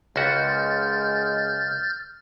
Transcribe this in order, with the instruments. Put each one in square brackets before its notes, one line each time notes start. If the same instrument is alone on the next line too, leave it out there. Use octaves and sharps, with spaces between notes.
[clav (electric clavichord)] C#2 F#4 [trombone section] F#2 G#3 [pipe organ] F6 G6 A6